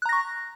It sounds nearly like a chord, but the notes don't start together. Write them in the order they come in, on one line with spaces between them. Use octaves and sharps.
F#6 A#5 A#6 C#6